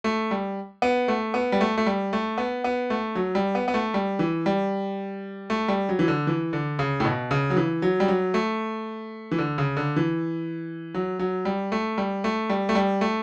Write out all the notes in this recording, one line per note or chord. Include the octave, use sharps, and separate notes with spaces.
A3
G3
B3
A3
B3
G3
A3
A3
G3
A3
B3
B3
A3
F#3
G3
B3
B3
A3
G3
E3
G3
A3
G3
F#3
E3
D3
E3
D3
C#3
A2
B2
C#3
F#3
E3
F#3
G3
F#3
A3
E3
D3
C#3
D3
E3
F#3
F#3
G3
A3
G3
A3
G3
A3
G3
A3